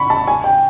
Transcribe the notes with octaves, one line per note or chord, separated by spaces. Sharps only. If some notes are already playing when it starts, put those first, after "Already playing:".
Already playing: B5 C#6
A5
G#5
G5